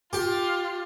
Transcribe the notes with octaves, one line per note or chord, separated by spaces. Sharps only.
F4 G4